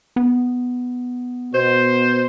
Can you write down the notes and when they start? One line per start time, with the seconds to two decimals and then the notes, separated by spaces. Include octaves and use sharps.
0.16 B3
1.54 B2 C5